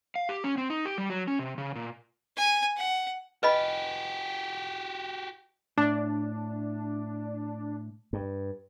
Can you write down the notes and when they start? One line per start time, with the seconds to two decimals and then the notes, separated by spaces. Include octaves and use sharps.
0.16 F5
0.29 G4
0.44 C#4
0.58 C4
0.70 D#4
0.86 G4
0.98 G3
1.10 F#3
1.28 C#4
1.39 C3
1.58 C#3
1.75 A#2
2.37 G#5
2.77 F#5
3.43 F#4 G4 B4 D#5 B5
5.78 A2 D4
8.13 G2